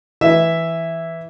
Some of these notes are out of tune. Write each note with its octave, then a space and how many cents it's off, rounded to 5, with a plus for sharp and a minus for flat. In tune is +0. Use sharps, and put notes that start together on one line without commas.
E3 +0 E5 +0